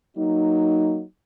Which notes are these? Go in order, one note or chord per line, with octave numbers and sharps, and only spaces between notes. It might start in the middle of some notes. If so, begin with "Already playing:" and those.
F#3 A#3 D#4